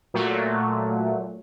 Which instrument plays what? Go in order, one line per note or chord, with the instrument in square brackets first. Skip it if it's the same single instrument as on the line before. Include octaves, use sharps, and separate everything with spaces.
[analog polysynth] A#2 F#3 A3